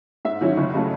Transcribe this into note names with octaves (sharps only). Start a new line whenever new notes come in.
G#2 E5
D#3 F#3 C#4 E4
F#1
C#3 F#3 A3